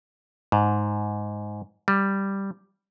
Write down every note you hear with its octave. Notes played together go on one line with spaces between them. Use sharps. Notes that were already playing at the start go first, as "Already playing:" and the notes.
G#2
G3